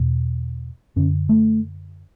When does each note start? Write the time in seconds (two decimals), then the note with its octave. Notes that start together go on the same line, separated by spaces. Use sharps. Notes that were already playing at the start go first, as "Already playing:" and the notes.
Already playing: E2 B2
0.96 F#2 D3 C#4
1.29 A3